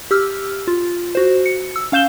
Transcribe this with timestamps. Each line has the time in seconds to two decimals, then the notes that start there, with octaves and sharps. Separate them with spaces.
0.11 G4 E6 F6
0.67 F4
1.15 F#4 C5
1.46 C#7
1.76 E6
1.92 C#4 F5 G6 E7 G7